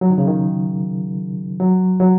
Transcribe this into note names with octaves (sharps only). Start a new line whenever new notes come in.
F#3
D#3
C#3
D#3
F#3
F#3